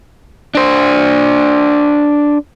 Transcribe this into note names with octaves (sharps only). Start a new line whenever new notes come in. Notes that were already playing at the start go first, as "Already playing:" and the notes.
D4 C5